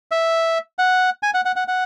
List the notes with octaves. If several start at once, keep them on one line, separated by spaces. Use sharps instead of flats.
E5
F#5
G#5
F#5
F#5
F#5
F#5